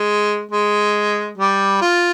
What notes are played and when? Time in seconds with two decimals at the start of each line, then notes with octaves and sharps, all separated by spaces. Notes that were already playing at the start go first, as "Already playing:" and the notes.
Already playing: G#3
0.51 G#3
1.37 G3
1.81 F4